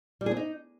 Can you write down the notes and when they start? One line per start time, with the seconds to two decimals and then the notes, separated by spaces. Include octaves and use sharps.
0.21 G3
0.26 G#4
0.31 C4
0.37 D#4